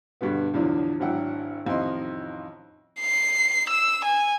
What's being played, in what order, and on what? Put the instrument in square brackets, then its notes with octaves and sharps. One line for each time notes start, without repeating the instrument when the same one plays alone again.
[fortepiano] G2 B2 D3 B3
E2 A2 D3 F3 F#3 D4
G#1 F#3 D4 E4 F#5 G5
A1 F2 D#3 E4 D#5 C6
[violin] C7
E6
G#5